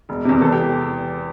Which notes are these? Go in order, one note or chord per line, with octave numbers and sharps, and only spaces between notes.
E1
E2 C3
E2 A4
G4